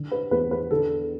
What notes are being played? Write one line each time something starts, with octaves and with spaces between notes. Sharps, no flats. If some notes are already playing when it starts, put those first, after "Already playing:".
Already playing: D3
B4
E2 B4
B4
D3 A4